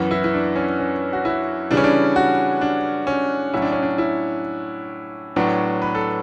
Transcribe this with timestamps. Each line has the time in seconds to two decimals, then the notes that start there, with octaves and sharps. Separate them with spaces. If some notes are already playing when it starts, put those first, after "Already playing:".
Already playing: F#2 E3 B3
0.11 E4
0.24 E4
0.34 D4
0.56 C#4
0.79 C#4
1.13 F#4
1.25 E4
1.71 C#3 E3 G3 D4
1.77 C#4
1.84 D4
2.16 F#4
2.61 D4
3.07 C#4
3.54 A2 F#3 C#4 E4
3.62 D4
3.72 C#4
3.82 D4
3.98 E4
5.36 A2 F#3 B3 D4
5.82 B4
5.95 A4